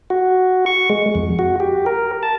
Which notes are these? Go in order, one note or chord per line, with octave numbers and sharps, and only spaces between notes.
F#4
C#6
G#3
F2
F#4
G4
A#4
A5